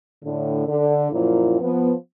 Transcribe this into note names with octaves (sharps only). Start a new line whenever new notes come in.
A2 D3
D3
F#2 A#2 F3 E4 F4
F3 B3